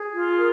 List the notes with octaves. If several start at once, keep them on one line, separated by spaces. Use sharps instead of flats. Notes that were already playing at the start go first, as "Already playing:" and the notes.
Already playing: G#4
F4
A#4